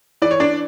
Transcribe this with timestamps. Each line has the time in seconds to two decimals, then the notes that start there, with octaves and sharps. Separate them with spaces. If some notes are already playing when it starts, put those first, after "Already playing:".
0.22 E3 D5
0.31 C#5
0.40 D4 D5